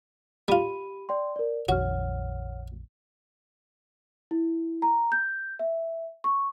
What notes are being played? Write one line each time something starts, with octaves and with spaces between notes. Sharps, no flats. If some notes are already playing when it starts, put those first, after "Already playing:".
G3 F4 G4 B5 D#7
D5 G5 C6
A#4 D5
A#1 F2 D#3 F#4 C#5 F#5 F6
E4
A#5
G6
E5
C#6